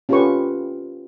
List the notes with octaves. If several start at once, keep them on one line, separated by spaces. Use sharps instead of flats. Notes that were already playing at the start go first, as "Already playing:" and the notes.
C#4 F4 G4 A4 B4 C#6